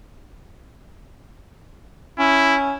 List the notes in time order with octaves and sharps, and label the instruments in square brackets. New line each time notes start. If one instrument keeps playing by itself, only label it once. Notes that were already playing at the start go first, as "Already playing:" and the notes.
[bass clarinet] C#4 [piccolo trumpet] E4